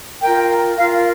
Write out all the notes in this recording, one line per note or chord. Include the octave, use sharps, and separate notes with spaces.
F4 A#4 G5
F4 A#4 F5